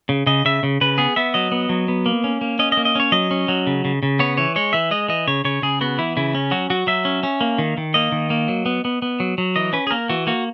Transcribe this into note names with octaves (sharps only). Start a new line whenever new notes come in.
C#3
C#3 D#5
C#3 E5
C#3
C#3 B4
B3 G#4
B3 E5
F#3 D#5
B3
F#3
B3
A#3
C#4
A#3
C#4 D#5
D#5
A#3
D#5
C#4 C#5
F#3 D#5
C#4
F#3
C#3
C#3
C#3
B3 C#5
E3 C#5
G#3 C#5
E3 E5
G#3 D#5
E3 D#5
C#3 C#5
C#3 C#5
C#3 G#4
B3 F#4
E3 E4
C#3 E4
C#4
F#3 F#4
F#3 F#4
F#3 E5
C#4
C#4
A#3
D#3
D#3
A#3 D#5
D#3
A#3
F#3
B3
B3
B3
F#3
F#3
E3 D#5
C#4 B4
G#4
A#3 A#4
E3 F#4
A#3 F#4